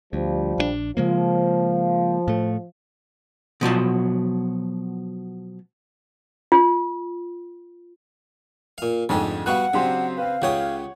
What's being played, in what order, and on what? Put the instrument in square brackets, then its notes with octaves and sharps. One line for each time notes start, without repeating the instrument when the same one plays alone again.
[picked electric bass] D2 [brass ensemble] F3 G3
[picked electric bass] A#1 E3 D4
[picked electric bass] C#3 G#3 A#3 [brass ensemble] F3
[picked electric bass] A2 A3
[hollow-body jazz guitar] B2 F3 F#3 A5
[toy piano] F4
[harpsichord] A#2 F5
[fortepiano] F2 G#2 A3 [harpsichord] D3 G#3 G4
[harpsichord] G3 B3 F#4 [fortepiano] F5 F#6 [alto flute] F#5
[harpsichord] C#3 [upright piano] F#3 C4 [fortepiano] D4 G4 C6
[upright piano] C4 B4 [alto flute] F5
[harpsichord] C#2 G4 D#6 [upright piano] C#3 G5 [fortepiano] C#5 F#5